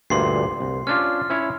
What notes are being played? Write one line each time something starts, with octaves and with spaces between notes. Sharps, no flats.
D2 G2 A#2 C6 C7
C2
C#4 D4 F4 F6
C#4 E4 C#5